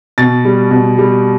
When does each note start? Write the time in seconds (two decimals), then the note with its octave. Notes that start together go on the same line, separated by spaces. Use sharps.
0.18 B2 A6
0.45 G3
0.71 B2
0.98 G3